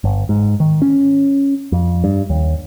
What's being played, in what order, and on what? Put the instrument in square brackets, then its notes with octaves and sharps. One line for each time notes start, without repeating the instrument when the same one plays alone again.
[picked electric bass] G1
G#2
D#3
C#4
F2
G2
D#2